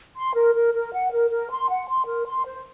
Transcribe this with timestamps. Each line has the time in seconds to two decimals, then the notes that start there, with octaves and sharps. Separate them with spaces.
0.16 C6
0.34 A#4
0.54 A#4
0.73 A#4
0.92 F#5
1.11 A#4
1.30 A#4
1.50 C6
1.70 F#5
1.87 C6
2.07 A#4
2.27 C6
2.45 C5